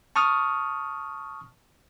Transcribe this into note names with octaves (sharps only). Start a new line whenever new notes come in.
A5 C#6 D#6 F6